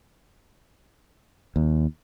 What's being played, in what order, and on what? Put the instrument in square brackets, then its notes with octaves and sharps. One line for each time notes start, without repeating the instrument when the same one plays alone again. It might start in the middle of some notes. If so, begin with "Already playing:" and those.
[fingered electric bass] D#2